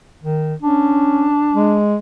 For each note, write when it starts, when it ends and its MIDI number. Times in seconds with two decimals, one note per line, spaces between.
0.23 0.55 51
0.63 1.27 61
0.63 1.80 62
1.54 1.96 56